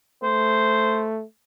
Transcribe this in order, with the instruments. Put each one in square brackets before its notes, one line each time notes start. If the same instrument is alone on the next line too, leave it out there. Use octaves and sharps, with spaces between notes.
[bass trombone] A3 [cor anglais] C5